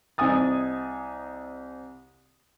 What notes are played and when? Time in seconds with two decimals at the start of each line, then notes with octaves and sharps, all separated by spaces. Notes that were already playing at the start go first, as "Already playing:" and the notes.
0.18 C2 C4 D#5 G#5 D#6 A6